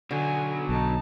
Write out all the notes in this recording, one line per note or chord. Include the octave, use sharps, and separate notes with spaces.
B2 D3 F#3 G#5
B1 D#4 A5